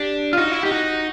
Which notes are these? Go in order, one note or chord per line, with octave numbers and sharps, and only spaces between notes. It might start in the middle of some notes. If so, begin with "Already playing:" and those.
Already playing: D4 G4
F4
D#4 F#4
E4
D#4 G4
F#4